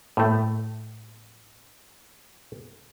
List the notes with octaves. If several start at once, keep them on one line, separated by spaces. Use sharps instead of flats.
A2 A3